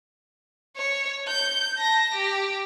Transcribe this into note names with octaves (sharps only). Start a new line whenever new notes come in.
C#5
G6
A5 A#6
G4